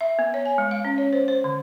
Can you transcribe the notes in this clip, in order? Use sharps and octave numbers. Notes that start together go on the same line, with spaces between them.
E5
B3
C#5
G#5
G#3
F5
C#4
C#5
C5
C5
D3